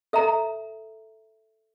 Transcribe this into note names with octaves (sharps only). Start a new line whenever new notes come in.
A4 E5 A#5